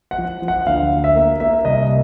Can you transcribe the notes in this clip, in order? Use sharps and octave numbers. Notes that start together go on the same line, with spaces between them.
F#5
F3
F3
F#5
D2 F5
D2
E5
A#3
A#3 E5
C2 D#5